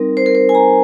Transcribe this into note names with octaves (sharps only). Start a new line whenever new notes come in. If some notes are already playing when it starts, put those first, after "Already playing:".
Already playing: G3 C4 D#4 A#4
C5
A#4
C5
G#5
A#5